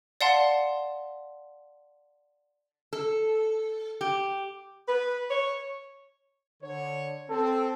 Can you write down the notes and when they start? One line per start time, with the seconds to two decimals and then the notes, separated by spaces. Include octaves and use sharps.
0.21 D5 F5 F#5 A5 C6
2.93 A4
4.01 G4
4.87 B4
5.31 C#5
6.62 D3 C#5
7.29 C4 A4